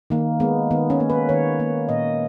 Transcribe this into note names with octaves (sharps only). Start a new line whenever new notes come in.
D#3 A#3
G#3 B3
D#3 B3
C#4
A#3
B4
D#3 C#5
A#3
A#2 D#5